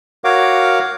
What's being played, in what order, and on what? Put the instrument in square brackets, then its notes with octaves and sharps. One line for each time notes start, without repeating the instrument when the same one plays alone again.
[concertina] F#4 A#4 C#5 F5 F#5 D6